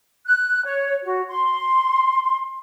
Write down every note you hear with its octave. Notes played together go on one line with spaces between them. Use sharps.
F#6
C#5
F#4
C6